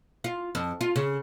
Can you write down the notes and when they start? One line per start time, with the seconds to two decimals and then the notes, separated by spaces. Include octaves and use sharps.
0.24 F4
0.55 F2
0.81 F4
0.96 C#3